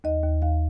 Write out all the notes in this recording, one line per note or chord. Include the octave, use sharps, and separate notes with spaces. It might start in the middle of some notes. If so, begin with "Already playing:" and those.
D#2 D#5
D#2
D#2 F5